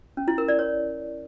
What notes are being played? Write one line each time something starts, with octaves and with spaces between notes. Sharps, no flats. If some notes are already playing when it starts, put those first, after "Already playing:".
C#4
E4
A#4
D5
C#5